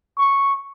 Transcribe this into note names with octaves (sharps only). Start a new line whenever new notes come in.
C#6